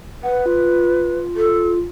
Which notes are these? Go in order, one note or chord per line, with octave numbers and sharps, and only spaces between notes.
B4 F#5
F4
A4